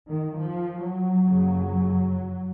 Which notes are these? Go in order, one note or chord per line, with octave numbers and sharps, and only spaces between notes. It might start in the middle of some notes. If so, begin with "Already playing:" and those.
D#3
F3
F#3
F#1 F2 C#3